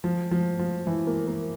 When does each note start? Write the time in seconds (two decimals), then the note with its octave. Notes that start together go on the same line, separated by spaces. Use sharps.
0.04 F3
0.31 F3
0.59 F3
0.87 E3
1.07 A#3
1.28 A#3